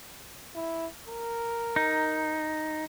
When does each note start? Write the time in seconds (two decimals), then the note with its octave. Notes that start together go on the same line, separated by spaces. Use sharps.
0.55 E4
1.08 A#4
1.76 D#4